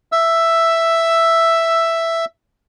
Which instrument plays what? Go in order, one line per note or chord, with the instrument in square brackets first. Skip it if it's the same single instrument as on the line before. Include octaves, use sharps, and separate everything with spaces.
[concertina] E5 E6